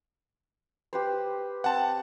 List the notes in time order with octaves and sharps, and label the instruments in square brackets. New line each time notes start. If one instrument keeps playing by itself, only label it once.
[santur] G4 B4 C5
[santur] C4 [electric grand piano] F#5 A5